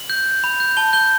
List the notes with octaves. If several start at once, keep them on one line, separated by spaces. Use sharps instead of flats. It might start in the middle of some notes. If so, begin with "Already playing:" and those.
Already playing: F#7
G6
G6
B5
G6
A5 G7
G6 G7